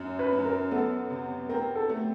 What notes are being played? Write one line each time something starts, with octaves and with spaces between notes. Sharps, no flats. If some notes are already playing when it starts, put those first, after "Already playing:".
Already playing: F#2
B4
F#2
A#4
B3 A4
C3
C4 A#4
A4
A3